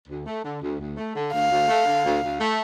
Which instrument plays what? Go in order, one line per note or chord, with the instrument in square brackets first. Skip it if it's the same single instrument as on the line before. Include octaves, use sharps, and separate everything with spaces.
[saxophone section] D2
A3
D3
D2
D2
A3
D3
[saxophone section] D2 [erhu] F5
[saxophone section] D2
A3
D3
D2
D2
A3